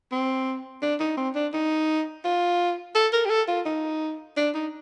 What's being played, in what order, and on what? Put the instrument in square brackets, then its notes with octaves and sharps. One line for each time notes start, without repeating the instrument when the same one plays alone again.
[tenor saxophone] C4
D4
D#4
C4
D4
D#4
F4
A4
A#4
G4
A4
F4
D#4
D4
D#4